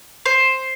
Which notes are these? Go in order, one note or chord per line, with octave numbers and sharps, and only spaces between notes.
C5